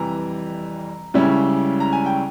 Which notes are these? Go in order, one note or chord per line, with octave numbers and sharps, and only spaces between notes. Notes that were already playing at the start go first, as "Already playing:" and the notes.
Already playing: F2 C3 E3 G3 A#5
C#2 C#3 G3 C#4 E4
A#5
G#5
G5